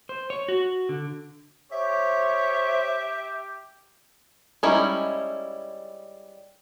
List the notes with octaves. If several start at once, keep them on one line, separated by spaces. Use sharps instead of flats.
C5
C#5
F#4
D3
G4 C5 C#5 E5
G3 G#3 C#4 D#4 E4